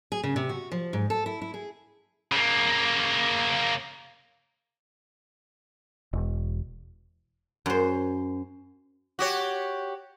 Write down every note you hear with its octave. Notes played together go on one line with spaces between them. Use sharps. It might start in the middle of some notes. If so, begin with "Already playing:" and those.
G#4
C#3
C3
F#4
F3
G#2
A4
E4
E4
G#4
C#3 A#3
E1
F#2 C5
F#4 G4 C#5